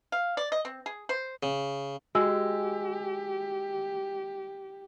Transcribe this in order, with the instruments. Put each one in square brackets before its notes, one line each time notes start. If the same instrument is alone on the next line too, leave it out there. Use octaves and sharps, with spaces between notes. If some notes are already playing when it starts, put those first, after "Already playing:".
[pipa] F5
D5
D#5
C4
G#4
C5
[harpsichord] C#3
[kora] G#3 [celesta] F#4 G#5 E6 [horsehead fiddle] G4